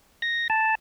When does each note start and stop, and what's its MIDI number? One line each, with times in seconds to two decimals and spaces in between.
0.22 0.48 94
0.50 0.75 81